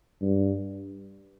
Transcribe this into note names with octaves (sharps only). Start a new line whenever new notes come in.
G2